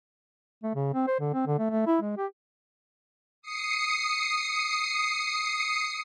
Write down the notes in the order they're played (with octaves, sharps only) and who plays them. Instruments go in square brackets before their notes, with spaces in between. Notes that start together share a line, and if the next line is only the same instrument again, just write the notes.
[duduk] A3
C#3
C4
C5
D3
C4
D3
A3
A3
E4
G#3
G4
[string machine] D#6 C7 C#7